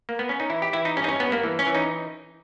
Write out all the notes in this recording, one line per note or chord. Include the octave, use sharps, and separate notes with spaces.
A#3
B3
C#4
D#4
E3 E4
G4
E3 E4
D#4
G2 C#4
D#4
C#4
G2 B3
A#3
E3
C#4
E3
D#4